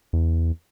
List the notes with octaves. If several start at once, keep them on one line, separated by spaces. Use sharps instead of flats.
E2